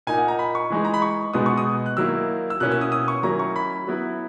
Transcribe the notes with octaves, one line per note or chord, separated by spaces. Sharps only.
A#2 A#3 D#4 G#5
F#5
A#5
B5
C#6
E3 G#3 D#4
A#5
B5
C#6
B2 G#3 B3 D#4 D#6
C#6
D#6
F#6
D#3 F#3 A#3 E4 E6
E6
B2 A#3 C#4 E4 F#6
E6
D#6
D#6
C#6
D#3 F#3 C#4 E4 A#5
C#6
B5
F#3 B3 E4